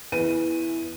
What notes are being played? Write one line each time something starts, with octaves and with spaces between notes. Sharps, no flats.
E2 E3 B4 D#7